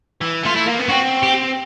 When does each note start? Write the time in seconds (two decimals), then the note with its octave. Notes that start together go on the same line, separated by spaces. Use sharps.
0.21 E3
0.43 A3 F4
0.55 E4
0.66 A#3
0.79 B3
0.88 C4 F#4
1.23 G4